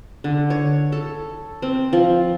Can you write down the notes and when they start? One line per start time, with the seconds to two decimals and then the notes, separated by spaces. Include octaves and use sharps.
0.24 D3
0.50 C#5
0.92 A4
1.62 C4
1.93 F3